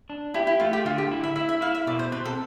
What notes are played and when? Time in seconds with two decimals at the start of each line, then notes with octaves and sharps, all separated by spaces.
0.10 D4
0.34 E4 G4
0.47 E4
0.60 A3 F4
0.73 G4
0.85 D3 F4
0.98 G4
1.11 E4
1.24 E5
1.36 E4 E5
1.49 E5
1.61 E4 F5
1.75 E5
1.87 B2 D5
1.99 C5
2.12 C4 B4
2.25 A4